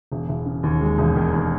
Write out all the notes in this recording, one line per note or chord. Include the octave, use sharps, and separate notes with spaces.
E1
E1
C#3
D#2
G#3
E1
D#3
D#2